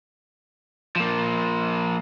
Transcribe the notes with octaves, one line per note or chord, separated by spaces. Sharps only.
F3 A#3